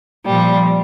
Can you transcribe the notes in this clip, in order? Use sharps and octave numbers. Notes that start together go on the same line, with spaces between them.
A#2 F3 G3